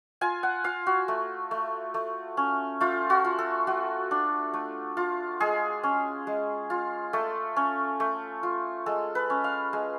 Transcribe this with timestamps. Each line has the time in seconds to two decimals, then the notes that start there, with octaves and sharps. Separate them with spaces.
0.21 F4 G#5
0.43 F#5
0.64 F4 F5
0.86 F#4
1.08 A3
1.51 A3
1.94 A3
2.37 C#4
2.81 A3 F4
3.10 F#4
3.25 F4
3.38 A4
3.67 A3 F#4
4.11 D4
4.54 A3
4.97 F4
5.40 G#3 G#4
5.83 C#4
6.27 G#3
6.70 F4
7.13 A3 A4
7.56 C#4
8.00 A3
8.43 F4
8.86 G#3 A4
9.15 B4
9.30 C#4
9.44 F5
9.73 G#3